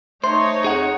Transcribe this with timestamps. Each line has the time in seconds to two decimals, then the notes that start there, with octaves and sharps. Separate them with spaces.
0.24 A3 D#4 C5 C#5 C6
0.64 F2 G#4 F#5